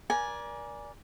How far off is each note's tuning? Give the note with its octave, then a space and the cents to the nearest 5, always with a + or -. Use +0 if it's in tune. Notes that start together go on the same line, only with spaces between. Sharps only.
A#4 +35 D5 -10 G#5 +0